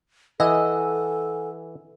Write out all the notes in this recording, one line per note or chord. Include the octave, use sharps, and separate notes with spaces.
E3 A4 D#5 F#5 G#5 E6